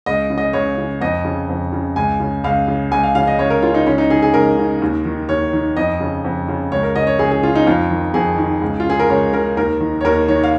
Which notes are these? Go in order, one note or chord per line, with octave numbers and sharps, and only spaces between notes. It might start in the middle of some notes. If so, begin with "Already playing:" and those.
C#2 D#5
C#3
D#5
C#2 C#5
C#3
F2 D#5
C#3
F2
C#3
C#2 G#5
C#3
C#2 F5
C#3
C#2 G#5
F5
C#3 F5
D#5
C#2 C#5
A#4
C#3 F4
D#4
C#2 C#4
D#4
C#3 G#4
G#4
C#2 A#4
C#3
D#2
D#3
D#2 C#5
D#3
F2 D#5
C#3
F2
C#3
C#2 C#5
A#4
C#3 D#5
C#5
C#2 G#4
G#4
C#3 F4
D#4
F2 F4
D#3
F2 G#4
D#3
C#2
F4
C#3 G#4
A#4
C#2 C#5
C#3 A#4
D#2 A#4
D#3
C#5
D#2 A#4
D#3 C#5
F5